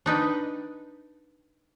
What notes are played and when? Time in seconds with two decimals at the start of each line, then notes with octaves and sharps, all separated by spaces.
0.06 D4 D#4 B4 G5